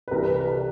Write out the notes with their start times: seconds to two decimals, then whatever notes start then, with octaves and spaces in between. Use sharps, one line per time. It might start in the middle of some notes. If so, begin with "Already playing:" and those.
0.08 B4
0.11 C2 C3 E3 A#4
0.23 B4
0.35 B4
0.47 A#4